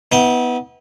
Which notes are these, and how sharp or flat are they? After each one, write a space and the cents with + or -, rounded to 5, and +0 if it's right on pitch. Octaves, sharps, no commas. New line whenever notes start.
B3 +0 E4 -40 G5 +0